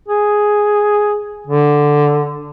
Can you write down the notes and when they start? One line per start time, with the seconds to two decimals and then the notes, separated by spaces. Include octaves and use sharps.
0.08 G#4
1.47 D3